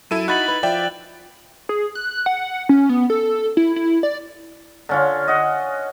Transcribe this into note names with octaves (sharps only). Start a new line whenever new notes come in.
F#2 E4 A4 D#7
D#4 E4 F#4 B5 F#6 A6 F#7
B4
F3 D5 E5 G5
G#4
F#6
F#5
C#4
B3
A4
E4
E4
D5
D3 C#4 F4
D#5 F#5